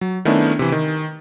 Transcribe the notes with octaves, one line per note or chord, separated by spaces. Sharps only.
F#3
D#3 A3 B3 C#4 D4 E4
C3 E3
D#3